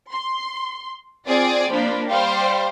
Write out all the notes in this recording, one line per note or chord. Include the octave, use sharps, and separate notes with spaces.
C6
C4 F4 G#4 D5
F3 A#3 D4 B5
G3 C5 F5 G5 C6